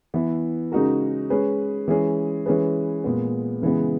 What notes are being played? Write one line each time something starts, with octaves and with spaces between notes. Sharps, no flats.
E3 B3 E4
C#3 G#3 D#4 F#4 A#4
G#3 C#4 G#4 B4
E3 G#3 C#4 G#4
E3 G#3 C#4 G#4 B4
A#2 G#3 B3
C#3 E3 G#3 B3